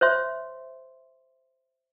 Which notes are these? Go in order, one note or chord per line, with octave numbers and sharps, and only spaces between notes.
C5 C#5 E5 C6